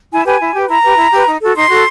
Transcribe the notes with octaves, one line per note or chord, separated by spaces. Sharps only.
E4 G#5
G4 B4 G#5
E4
G4 B4
E4 A#5
G4 B4
E4
G4 B4
D#4
F#4 A4
D#4 C6
F#4 A4